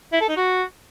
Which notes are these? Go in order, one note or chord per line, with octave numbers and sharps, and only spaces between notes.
E4
A4
D#4
F#4